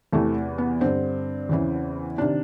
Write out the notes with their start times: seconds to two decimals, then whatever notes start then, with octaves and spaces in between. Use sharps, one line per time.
0.13 E2 C3 E3 A3
0.58 B3
0.81 G2 D3 C4
1.49 E2 C#3 E3
2.18 C3 D#3 D4